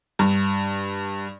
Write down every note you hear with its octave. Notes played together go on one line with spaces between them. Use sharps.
G2